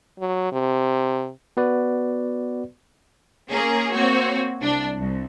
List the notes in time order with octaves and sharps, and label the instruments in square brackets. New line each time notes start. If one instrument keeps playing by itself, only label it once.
[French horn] F#3
C3
[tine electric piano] B3 F#4 B4 D5
[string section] A#3 C#4 G#4 A#4
A#3 C4 F#4 C#5
C2 D4
C2